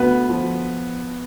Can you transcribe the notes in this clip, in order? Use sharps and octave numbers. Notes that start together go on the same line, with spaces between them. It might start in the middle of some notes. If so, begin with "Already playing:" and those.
Already playing: D2 B3 B4
F3